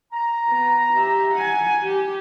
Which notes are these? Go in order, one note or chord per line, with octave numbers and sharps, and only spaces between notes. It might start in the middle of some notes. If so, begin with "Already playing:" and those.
A#5
B3
G4 E5
F#5 G#5
G4